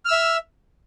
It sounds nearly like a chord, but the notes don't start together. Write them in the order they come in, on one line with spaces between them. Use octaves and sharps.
F6 E6 E5